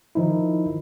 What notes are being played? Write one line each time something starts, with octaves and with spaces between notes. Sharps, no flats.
D#3 F3 D#4 E4